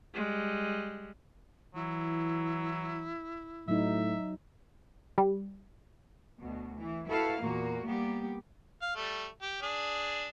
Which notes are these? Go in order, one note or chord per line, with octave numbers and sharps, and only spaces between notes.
G3 G#3
E3 F#3 E4
A2 F#3 D#4 E5
G3
D2 B2
E3
E4 F#4 A4 B4 F5
E2 A#2 A#3 F#4
G3 A#3 B3 G4
F5
G3 A3
G4
D4 G#4